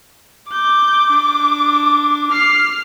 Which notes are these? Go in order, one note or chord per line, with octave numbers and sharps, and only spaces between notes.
D6 G6
D4
F6 C7